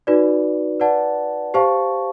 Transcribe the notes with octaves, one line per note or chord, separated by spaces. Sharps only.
D#4 F#4 B4 D5
B4 D5 F#5 A5
G4 C5 F5 A5 C#6